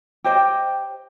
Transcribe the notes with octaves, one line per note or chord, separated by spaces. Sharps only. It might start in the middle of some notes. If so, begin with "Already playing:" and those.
G4 C5 D#5 G5